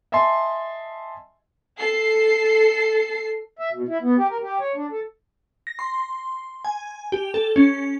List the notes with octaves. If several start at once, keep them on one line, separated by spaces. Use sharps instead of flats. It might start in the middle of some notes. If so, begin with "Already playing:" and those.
D#5 E5 G#5 A5 C6
A4 C7
E5
B2
E4
B3
G4
A#4
G4
C#5
D4
A4
A#6
C6
G#5
G4
A4
C#4